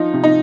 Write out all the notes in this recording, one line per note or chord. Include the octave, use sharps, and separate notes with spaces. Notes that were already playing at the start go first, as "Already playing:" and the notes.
Already playing: F3 D#4
C3
D#4